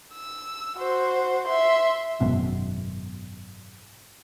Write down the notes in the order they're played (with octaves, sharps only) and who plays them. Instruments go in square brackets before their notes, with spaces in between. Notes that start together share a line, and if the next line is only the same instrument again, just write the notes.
[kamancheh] E6
F#4 C5
E5 C6
[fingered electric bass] G#1 F#2 B2